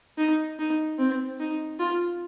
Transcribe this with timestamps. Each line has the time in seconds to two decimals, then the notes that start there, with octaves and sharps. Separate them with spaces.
0.18 D#4
0.59 D#4
0.99 C4
1.40 D#4
1.79 F4